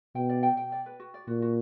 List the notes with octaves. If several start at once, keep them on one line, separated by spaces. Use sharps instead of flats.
B2 G5
D5
G5
G5
D5
B4
F#4
D5
A#2 F#4
F#4